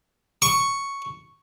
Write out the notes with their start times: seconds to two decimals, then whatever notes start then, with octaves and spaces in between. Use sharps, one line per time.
0.42 C#6